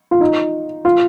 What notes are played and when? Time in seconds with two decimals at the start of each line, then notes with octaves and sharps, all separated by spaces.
0.11 F4
0.21 D#4
0.85 F4